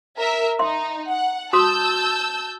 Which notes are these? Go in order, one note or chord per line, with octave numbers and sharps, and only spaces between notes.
A#4 E5
D#4 E5 C6
F#5
F#4 A5 C6 D#6 E6 G6